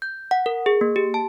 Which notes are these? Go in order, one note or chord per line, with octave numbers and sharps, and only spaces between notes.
G6
F#5
A#4
G#4
A#3
G4
A5